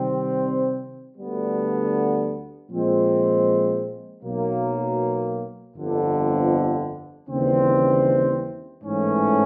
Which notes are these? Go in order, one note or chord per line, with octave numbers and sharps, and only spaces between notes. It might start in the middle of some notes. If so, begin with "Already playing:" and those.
Already playing: C3 D#3 G3 C4
D2 D3 G3 B3
A#2 F3 G#3 C4 F4
B1 B2 F#3 A#3
G1 F2 D3
D#2 C#3 E3 G3 C4
A1 G#2 E3 A3 C#4